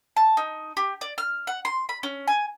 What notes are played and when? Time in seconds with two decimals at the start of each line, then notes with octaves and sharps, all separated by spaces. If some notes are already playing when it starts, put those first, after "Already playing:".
0.17 A5
0.37 D#4
0.77 G4
1.01 D5
1.18 F6
1.47 F#5
1.65 C6
1.89 B5
2.03 C#4
2.27 G#5